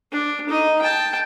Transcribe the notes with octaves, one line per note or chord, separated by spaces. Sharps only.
D4
D#4 D#5
G5 A5